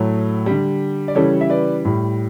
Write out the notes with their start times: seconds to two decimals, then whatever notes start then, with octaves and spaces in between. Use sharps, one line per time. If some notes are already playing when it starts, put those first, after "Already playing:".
Already playing: A2 F#3 A3
0.46 D3 G3
1.08 D5
1.15 C#3 E3 G3 A4 C#5
1.41 E5
1.50 B4 D5
1.85 A2 G3